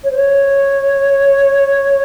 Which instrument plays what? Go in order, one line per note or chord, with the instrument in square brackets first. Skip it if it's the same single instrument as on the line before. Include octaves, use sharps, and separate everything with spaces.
[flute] C#5
C5
C#5